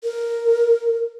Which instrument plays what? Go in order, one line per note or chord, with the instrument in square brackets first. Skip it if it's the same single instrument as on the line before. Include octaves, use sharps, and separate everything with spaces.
[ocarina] A#4